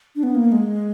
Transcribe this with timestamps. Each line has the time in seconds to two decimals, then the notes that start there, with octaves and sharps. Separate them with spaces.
0.16 D4
0.23 B3
0.35 A#3
0.52 G#3